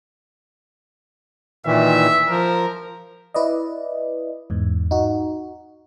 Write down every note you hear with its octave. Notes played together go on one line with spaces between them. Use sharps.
A#2 D#3 E3 E5
F3 A#4
E4 B4 D5 D#5
E2 G#2
D#4 F#4